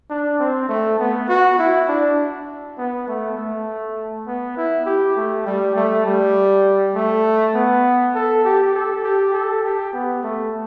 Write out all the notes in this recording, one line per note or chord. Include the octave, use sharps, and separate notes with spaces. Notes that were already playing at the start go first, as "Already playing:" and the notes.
D4
C4
A3
B3
F#4
E4
D4
B3
A3
A3
B3
E4
G4
A3
G3
A3
G3
A3
B3
A4
G4
A4
G4
A4
G4
B3
A3